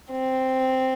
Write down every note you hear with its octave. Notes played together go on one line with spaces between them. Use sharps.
C4